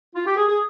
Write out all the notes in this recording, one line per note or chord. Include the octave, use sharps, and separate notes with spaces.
F4
G4
G#4
G#4